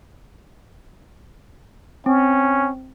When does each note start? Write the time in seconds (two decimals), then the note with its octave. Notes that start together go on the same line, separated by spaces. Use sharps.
2.06 C4 C#4